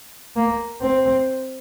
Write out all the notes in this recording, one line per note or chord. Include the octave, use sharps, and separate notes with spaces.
A#3
C4